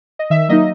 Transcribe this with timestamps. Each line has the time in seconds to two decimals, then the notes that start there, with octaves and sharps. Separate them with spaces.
0.19 D#5
0.30 D#3 E5
0.49 F#3 A#3 D#4 D#5